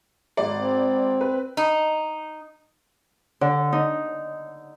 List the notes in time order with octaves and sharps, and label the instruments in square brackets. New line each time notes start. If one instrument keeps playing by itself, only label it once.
[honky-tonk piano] G#1 D5
[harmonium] C4
[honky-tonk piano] B4
[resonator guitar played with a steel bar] D#4
[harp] D3
D#4